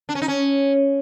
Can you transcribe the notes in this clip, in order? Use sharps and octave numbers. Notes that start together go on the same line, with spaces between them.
D4
C#4
D#4
C#4